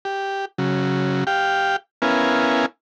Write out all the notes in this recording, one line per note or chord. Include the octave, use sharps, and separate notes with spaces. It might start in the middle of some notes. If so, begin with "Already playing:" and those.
G4
C#3 F#3
G4 F5 G5
B3 C#4 E4 A#4 F5 G#5